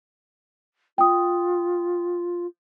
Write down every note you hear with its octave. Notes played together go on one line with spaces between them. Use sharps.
F4 G5 D#6